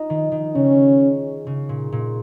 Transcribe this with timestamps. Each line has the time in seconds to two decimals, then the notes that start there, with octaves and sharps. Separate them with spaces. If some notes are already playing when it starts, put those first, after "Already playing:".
Already playing: D#4 F4
0.10 D#3
0.32 D#3
0.55 C#3 C#4
1.47 C#3
1.69 A#2
1.92 A#2